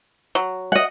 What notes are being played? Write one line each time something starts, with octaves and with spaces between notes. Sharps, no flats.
F#3
D#5 F#5